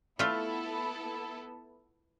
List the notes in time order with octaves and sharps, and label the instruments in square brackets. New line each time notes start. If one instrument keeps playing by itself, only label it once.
[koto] A3 F4 [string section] B3 E4 A4